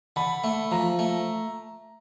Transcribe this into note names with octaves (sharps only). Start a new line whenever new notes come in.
D3 B5
A3
F3 A#5
A3